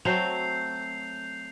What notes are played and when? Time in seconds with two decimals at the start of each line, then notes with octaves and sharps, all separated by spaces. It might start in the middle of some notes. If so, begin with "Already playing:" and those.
0.05 F#3 A3 C4 G6 C7 F7